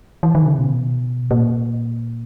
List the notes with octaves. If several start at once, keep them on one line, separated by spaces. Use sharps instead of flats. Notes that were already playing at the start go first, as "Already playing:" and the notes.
E3
D#3
C#3
B2
A#2